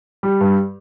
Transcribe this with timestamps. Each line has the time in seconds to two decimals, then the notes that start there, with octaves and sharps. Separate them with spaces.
0.23 G3
0.41 G2